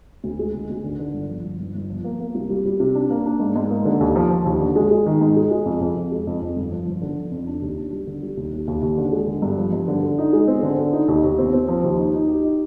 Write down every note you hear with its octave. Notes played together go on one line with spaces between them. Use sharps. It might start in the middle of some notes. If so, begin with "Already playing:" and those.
D2
G#3
D2
D2
D3
D3
G1
F3
G1
G1
G1
F3
A#3
A#3
C2
G3
G3
C3
D4
A#3
D4
G#2
G#2
A#3
D3
D#2
F3
F3
D#2
D3
G#3
G#3
D#3
G#2
G#3
G#3
F2
F2
F2
G#3
F2
F2
G1
F3
G1
D3
F3
F2
D4
D#2
D4
G3
D3
G3
D#2
D#2
D#2
D#2
D3
G#3
D3
G2
F3
G2
D3
D3
D#4
G#3
C4
D3
D3
D#4
D#2
D#2
C4
C4
F3
D#2
D#4
D#4
G4
D#4